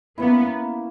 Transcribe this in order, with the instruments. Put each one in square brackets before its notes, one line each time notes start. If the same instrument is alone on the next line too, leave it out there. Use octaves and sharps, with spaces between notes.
[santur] A#3 C#4 E4 [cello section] B3